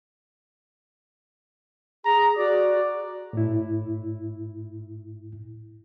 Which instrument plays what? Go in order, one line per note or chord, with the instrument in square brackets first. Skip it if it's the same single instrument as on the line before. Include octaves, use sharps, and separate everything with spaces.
[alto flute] G#4 [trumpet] A#5
[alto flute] F#4 [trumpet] D5
[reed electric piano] A2 E4